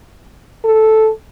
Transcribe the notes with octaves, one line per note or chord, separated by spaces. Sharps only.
A4